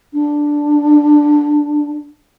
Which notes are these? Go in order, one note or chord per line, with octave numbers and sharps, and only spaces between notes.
D4